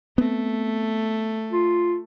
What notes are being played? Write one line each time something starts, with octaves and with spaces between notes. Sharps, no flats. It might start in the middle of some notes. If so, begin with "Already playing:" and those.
A3 B3 C4
F4